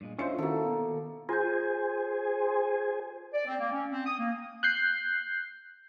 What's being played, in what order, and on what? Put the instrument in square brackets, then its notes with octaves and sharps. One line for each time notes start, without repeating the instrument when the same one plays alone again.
[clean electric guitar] G2 A#2 G#3
[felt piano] D2 C#7 [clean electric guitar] D3 D#5 E5 [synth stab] C#4 F4 C5
[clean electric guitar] D#3 [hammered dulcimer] A#3 A4 [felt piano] E4 F#4
[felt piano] B2
[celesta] F4 G6 [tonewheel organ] G#4 C5 G#5
[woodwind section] D5
C4
A#3
C#4
C4
D#6
A#3
[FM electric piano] F#6 G6 C7